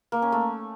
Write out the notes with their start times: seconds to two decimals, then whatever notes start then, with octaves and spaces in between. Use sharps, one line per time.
0.12 A#3
0.22 C#4
0.32 A3